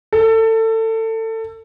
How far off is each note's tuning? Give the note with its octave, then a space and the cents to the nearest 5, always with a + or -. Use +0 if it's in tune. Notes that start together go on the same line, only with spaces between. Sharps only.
A4 +25